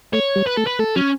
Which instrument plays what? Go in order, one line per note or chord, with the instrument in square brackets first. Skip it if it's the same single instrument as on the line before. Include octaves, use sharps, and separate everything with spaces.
[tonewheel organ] A3 [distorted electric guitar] C#5
[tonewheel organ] G3
[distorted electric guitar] B4
[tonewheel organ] A3 [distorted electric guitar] A4
[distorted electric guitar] B4
[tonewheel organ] A3 [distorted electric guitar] A4
[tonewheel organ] F#3 [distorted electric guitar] C#4